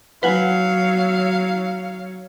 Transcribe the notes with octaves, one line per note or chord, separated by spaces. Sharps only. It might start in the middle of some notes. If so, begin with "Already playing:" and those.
F#3 B4 C#5 F5 F#5 G#5